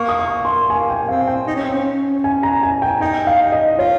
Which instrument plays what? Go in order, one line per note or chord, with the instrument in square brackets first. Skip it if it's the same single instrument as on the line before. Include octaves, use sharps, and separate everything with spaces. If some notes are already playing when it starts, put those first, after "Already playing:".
Already playing: [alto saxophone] A#3 [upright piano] C#6
[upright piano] D#6
C#6
C6
[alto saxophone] A#3 [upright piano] G#5
[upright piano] G5
[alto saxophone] C4 [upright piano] F5
[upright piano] G5
[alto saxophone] D#4
C#4
C4
C#4
[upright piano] G#5
A#5
G#5
G5
[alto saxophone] D#4 [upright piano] G5
[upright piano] F5
D#5
[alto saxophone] F4 [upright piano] C#5